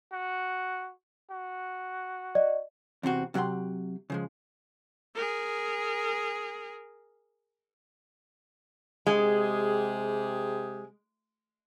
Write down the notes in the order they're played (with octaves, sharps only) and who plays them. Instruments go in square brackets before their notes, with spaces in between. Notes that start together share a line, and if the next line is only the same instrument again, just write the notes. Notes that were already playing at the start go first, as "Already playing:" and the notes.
[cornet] F#4
F#4
[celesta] D5 D#5
[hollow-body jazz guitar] E2 C3 C4 F#4
C3 F#3 F#5 G5 C6
C#3 F3 G#3
[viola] G#4 A#4
[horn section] C3 G4 G#4 [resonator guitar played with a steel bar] G#3